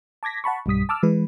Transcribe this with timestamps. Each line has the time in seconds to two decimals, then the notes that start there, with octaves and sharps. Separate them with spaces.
0.23 A5 D6 G#6 A#6 B6
0.44 F#5 A5 B5 C#6
0.66 B1 G2 G3 D#6 B6
0.89 A5 D6 E6 F6
1.03 E3 G#3 B4